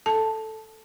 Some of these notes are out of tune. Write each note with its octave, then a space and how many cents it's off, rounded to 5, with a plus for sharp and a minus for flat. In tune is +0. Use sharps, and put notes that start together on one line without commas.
A4 +0 A5 +0